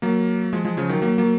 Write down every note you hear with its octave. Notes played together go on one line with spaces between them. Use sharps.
F#3 A#3
F3 G#3
F3 G#3
C#3 F3
D#3 F#3
F#3 A#3
F#3 A#3